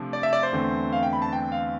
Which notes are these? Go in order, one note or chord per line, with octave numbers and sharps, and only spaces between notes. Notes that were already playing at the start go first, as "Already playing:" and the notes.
Already playing: C3 F3 A3 D4
D5
E5
D5
C5
E2 D3 A3 C4
F5
G5
B5
A5
G5
F5